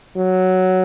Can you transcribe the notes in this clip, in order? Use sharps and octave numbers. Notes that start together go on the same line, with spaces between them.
F#3